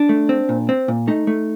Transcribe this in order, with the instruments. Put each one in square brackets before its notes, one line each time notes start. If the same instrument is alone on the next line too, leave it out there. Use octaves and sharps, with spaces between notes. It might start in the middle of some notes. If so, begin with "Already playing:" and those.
Already playing: [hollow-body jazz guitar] D4
A3
C4
A#2
C4
A#2
A3 D#4
A3